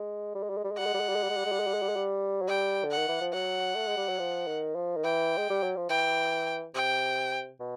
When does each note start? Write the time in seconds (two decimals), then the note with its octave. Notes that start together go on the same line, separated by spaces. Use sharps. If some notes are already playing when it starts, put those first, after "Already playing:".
Already playing: G#3
0.35 G3
0.43 G#3
0.50 G3
0.58 G#3
0.64 G3
0.72 G#3
0.78 G3 F#5
0.86 G#3
0.94 G3
1.01 G#3
1.09 G3
1.16 G#3
1.23 G3
1.30 G#3
1.37 G3
1.46 G#3
1.52 G3
1.60 G#3
1.67 G3
1.74 G#3
1.82 G3
1.89 G#3
1.96 G3
2.42 F#3
2.48 G3 G5
2.84 D3
2.91 F#5
2.97 D#3
3.09 E3
3.21 F3
3.33 F#3 F#5
3.76 A3
3.87 G#3
3.97 G3
4.09 F#3
4.19 F3
4.47 D#3
4.75 F3
4.97 D#3
5.04 E3 G5
5.38 G#3
5.50 G3
5.63 F#3
5.77 F3
5.90 E3 G5
6.75 C3 G5
7.60 B2